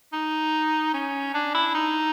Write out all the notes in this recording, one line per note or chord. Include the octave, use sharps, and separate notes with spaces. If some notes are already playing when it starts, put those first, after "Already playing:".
D#4
C#4
D4
E4
D#4